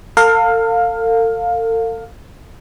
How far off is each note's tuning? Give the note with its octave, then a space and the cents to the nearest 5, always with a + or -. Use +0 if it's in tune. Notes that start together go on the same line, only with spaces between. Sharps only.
A4 +45 F5 +15